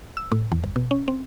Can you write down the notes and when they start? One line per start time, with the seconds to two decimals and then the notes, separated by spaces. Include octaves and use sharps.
0.17 E6
0.32 A2
0.52 E2
0.64 G1
0.76 B2
0.91 C#4
1.08 C4